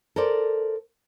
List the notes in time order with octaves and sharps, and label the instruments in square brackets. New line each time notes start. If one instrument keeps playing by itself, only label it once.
[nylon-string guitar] A4 A#4 C5 D5